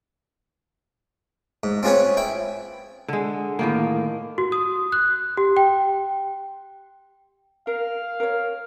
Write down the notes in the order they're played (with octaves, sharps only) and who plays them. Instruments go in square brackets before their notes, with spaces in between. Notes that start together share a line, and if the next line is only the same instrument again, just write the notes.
[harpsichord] G#2
C4 C#4 F4 G#4 B4 C#5
E4 G5
[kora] D3 G#3
A2 D#3 A#3
[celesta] F#4
D#6
F#6
G4
G5
[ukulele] A#4 [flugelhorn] F5
[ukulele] A#4 C#5